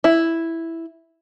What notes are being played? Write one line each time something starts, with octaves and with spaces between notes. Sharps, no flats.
E4